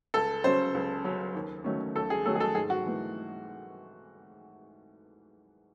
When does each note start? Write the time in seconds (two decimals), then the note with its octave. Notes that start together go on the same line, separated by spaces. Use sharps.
0.14 C#2 A4
0.44 C#3 F#3 C#4 C5
0.75 C#2
1.04 C#3 F#3 C#4
1.35 D#2
1.64 D#3 F#3 A3 C#4
1.95 D#2 A4
2.10 G#4
2.25 D#3 F#3 A3 C#4 A4
2.35 G#4
2.40 A4
2.55 G#2 G#4
2.70 F#4
2.86 E3 A3